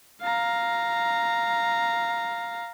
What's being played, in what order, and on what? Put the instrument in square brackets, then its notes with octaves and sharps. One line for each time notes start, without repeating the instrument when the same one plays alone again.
[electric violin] F5 A#5